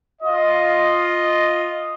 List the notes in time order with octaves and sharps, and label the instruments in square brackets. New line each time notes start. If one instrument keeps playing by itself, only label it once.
[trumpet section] F4 D#5